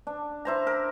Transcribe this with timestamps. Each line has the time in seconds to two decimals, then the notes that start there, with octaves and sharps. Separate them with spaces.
0.07 D4
0.45 E4 C5 A#5
0.67 A#4